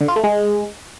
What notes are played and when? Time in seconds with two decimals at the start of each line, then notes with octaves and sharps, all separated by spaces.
0.01 D3
0.08 F4
0.16 A3
0.24 G#3